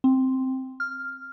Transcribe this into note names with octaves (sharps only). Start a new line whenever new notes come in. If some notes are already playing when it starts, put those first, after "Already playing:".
C4
F6